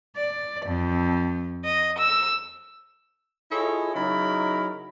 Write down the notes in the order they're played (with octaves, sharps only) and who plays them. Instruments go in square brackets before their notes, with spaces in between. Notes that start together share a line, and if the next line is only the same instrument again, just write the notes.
[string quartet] D5
F2
D#5
E6
[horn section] E4 F4 G#4 A4 C#5 D#5
C#3 F#3 D#4 E4 A#4 B5